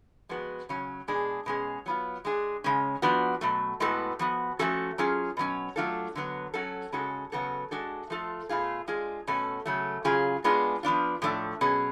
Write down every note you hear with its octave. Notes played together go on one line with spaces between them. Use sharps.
F3 G#3 B3 F#4
C#3 F#3 C#4
B2 G#3 D4 G#4
B2 G#3 C#4 G#4
F#3 B3 F4
G#3 D4 G#4
C#3 G#3 C#4
F3 B3 D4 F#4
B2 F#3 A3
A2 G#3 B3 F#4 A4
F3 B3 F#4
F3 A3 C#4 F#4 A4
F#3 C#4 F4 G#4
B2 F#3 C#4
F#3 A3 D4 F4 A4
D3 F#3 B3
F#3 C#4 F#4 A4
C#3 G#3 C#4 F#4 A4
C#3 F#3 B3 F#4 A4
G#3 D4 F#4 A4
F3 A3 F4 A4
B2 A3 F4 G#4
G#3 D4 F4 G#4
B2 A3 C#4 F#4 A4
C#3 F#3 A3
C#3 F#3 C#4 F4 G#4
G#3 B3 D4 F4 G#4
F3 B3 D4 F4
A2 F3 A3 D4
B2 F#3 C#4 G#4